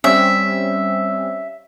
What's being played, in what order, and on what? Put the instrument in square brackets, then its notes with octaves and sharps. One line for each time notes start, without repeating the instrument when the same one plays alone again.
[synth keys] G3 C4 C#4 [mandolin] E5